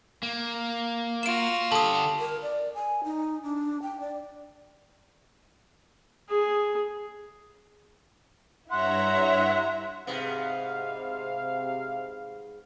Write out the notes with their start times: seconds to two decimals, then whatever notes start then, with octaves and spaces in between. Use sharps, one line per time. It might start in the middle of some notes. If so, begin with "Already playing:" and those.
0.23 A#3
1.23 F4 F#4 D7 E7
1.72 D3 G4 A4 A5 D#6
2.20 A#4
2.42 D5
2.75 G#5
3.04 D#4
3.43 D4
3.82 G5
4.00 D5
6.30 G#4
8.71 G2 E4 C#5 E5 F#5 A#5 C6
10.07 G#2 C3 B3 F5